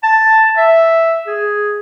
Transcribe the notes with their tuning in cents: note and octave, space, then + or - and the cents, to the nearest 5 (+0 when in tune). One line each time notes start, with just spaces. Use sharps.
A5 +5
E5 +0
G#4 +0